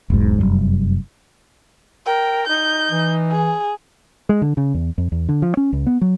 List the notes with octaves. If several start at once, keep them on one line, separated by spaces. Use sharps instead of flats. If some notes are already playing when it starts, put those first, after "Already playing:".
E1 B1 G#2
F1 B1 F#2 G3
A#4 G5
D#4 G6
E3
G#4
G#3
D3
C#3
E2
F2
E2
D3
F3
C#4
C#2
B3
F#3